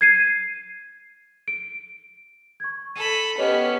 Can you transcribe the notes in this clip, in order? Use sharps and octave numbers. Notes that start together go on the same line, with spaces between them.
G#6 C7 D#7
D7
C#6 G#6
A4 B5 D#7
B3 C#4 G4 B4 C#5 D#5